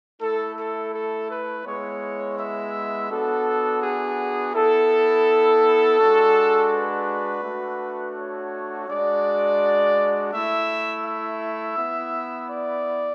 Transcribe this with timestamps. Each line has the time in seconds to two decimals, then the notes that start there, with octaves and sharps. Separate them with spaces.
0.21 A3 E4 A4
0.57 A4
0.93 A4
1.29 B4
1.65 G#3 B3 E4 C#5
2.37 E5
3.10 B3 D4 F#4 A4
3.82 G#4
4.54 B3 E4 A4
5.99 G#3 D4 F#4
6.72 B4
7.44 A3 D4 F#4
8.16 C#5
8.88 G#3 D4 F#4 D5
10.33 A3 E4 E5
11.05 E5
11.78 B3 E4
12.50 D5